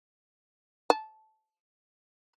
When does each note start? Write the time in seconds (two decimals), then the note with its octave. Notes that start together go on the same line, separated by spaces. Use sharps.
0.90 A5